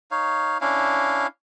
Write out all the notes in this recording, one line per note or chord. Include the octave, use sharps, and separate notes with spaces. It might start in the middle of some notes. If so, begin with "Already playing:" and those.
D#4 C#5 F5
C#4 D4 E4 F5